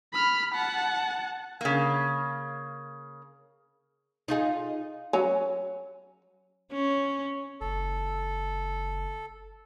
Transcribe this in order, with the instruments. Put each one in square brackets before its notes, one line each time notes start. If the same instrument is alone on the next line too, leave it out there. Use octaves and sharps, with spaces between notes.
[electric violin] B5 F6
F#5 A5
[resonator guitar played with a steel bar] C#3 A#3
[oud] D#4 F4 G#4
[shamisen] F#3 C#4
[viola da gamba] C#4
[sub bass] F#1 [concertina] A4